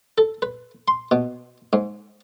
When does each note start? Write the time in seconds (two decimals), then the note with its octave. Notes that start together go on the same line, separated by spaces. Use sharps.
0.18 A4
0.42 B4
0.88 C6
1.11 B2
1.73 G#2